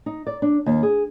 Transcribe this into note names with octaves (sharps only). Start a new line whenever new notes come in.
D#4
D5
D4
D#2
G#4